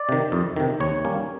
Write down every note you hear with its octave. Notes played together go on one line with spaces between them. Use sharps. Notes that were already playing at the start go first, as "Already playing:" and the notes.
Already playing: D5
C3 D#3
F2
C3 D#3
D#2 C#5
D#3 G3 A#3 C#4